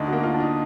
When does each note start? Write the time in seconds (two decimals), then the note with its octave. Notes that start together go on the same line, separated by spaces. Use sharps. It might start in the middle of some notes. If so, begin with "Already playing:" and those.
Already playing: D2 D4 D#4
0.08 A#3 F#4
0.23 F4
0.34 D4
0.40 D#4